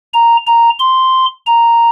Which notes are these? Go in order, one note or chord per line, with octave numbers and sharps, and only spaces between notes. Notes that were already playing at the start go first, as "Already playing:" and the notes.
A#5
A#5
C6
A#5